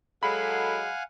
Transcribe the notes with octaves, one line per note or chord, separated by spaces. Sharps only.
F#3 G#3 A4 F5 F#5 G#5 B5